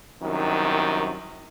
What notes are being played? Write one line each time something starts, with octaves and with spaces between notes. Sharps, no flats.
C2 F#2 D#3